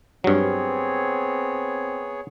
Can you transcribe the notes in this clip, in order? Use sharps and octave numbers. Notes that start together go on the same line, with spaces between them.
G2 F#3 B3 C4 G#4 C#5